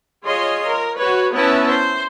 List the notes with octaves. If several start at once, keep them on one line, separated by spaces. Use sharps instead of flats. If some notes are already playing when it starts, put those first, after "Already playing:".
F4 G#4 C#5 D#5 C6
A#4
F#4 B4 C#5
B3 C#4 E4 B4 E5 A5
C5